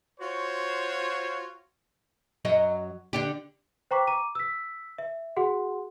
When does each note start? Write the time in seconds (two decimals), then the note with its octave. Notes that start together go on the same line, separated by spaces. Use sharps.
0.19 F4 F#4 C5 C#5
2.45 F#2 F#3 D#5
3.13 D3 D4 G4
3.91 C5 G5 A#5 C#6 D6 B6
4.07 A#5 D6 D#7
4.35 E6 B6
4.98 E5
5.36 F#4 G#4 F#5 C6